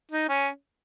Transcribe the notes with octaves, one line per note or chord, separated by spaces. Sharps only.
D#4
C#4